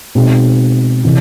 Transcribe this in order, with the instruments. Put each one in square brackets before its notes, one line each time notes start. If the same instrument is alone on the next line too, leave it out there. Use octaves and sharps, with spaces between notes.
[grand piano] B2 G#3 C4 D#4
C3 E3